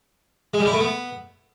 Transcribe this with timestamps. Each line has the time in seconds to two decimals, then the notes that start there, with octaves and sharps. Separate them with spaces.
0.54 G#3
0.60 G3
0.67 E4
0.74 A3
0.80 B3